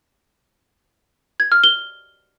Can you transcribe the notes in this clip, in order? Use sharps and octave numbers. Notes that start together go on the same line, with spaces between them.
G#6
F6
G7